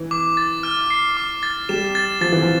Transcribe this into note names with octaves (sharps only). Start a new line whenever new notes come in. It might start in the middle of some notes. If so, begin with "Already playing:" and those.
Already playing: E3
D6
A6
F6
C7
D6
A6
G3 E7
A6
F3 A6
E3
F3